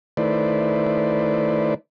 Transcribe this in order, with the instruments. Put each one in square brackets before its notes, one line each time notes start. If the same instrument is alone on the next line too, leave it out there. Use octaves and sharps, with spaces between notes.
[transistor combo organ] D#3 A3 E4 B4 C5 D5